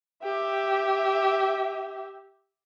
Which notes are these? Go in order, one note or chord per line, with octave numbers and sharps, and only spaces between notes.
G4 E5